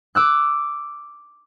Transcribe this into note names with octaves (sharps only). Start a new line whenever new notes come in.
D6 E6 F#6